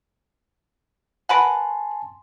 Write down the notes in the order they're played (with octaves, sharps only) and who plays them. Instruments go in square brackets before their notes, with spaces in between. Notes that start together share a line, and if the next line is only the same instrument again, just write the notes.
[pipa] A#4 B4 F#5 [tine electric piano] G#5 A5 C6